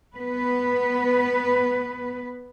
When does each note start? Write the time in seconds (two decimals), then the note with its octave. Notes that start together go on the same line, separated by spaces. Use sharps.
0.13 B3 B4